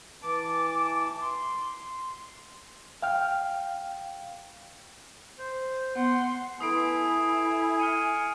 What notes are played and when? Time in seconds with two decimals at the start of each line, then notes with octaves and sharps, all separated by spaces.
0.22 E3 A5 D6
1.21 C6
3.02 F5 G5 F6
5.38 C5
5.95 B3 F#5 C6
6.60 E4 A4 B4 G#5 D#6 C7 D7
7.79 G#5 F6 C#7 D#7